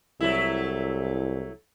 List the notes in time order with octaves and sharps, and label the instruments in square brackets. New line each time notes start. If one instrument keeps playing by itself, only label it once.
[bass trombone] C2 [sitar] F#3 A3 E4